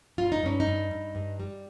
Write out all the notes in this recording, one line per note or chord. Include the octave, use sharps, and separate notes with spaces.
G2 F4
D#4
G2 C#4
D#4
G2
G2
G2
G3